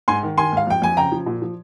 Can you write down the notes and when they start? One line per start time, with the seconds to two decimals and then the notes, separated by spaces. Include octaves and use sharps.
0.08 G#2 G#5 C6
0.23 D#3
0.38 D#3 G#5 C6
0.52 G#2 F5
0.67 F2 G5
0.82 F2 G#5
0.97 C#3 G5 A#5
1.12 F3
1.26 A#2
1.42 F3